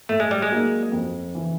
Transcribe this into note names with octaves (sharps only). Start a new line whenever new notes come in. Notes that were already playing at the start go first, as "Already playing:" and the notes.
A2 A3
G#3
G3
G#3
F#3 A#3 D#4
F2
C#3 E3